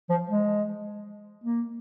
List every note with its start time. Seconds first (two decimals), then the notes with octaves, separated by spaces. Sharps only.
0.10 F3
0.29 G#3
1.44 A#3